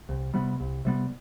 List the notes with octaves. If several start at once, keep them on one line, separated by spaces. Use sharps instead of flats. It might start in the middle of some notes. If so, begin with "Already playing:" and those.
C2
C3 G3 B3
C2
C3 G3 B3